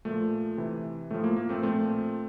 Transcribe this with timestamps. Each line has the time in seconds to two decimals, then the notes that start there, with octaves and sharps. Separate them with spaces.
0.05 A#2 F3 A3
0.57 C3 E3
1.11 A2 F3 A3
1.24 A#3
1.36 A#3
1.49 A3 C4
1.62 A#2 F3 A3 C4